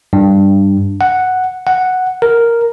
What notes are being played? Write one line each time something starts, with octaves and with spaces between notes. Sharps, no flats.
G2
F#5
F#5
A#4